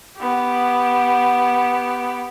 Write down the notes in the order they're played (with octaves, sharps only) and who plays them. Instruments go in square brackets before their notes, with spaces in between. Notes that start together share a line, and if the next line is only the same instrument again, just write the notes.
[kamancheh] B3 G4